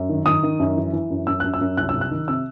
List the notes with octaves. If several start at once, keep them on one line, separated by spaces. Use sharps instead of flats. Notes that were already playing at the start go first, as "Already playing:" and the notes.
Already playing: F#2
D#3
D#3 D#6
D#3
F#2
E3
E3
F#2
F#2 E6
F#2 F#6
E6
F#2
C2 F#6
C2 E6
F#6
D#3
C3 E6